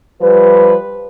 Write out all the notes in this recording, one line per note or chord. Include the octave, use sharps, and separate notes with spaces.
F3 G3 B4